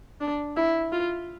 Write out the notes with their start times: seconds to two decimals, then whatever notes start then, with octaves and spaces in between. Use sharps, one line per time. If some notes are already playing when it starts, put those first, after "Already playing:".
0.21 D4
0.57 E4
0.92 F4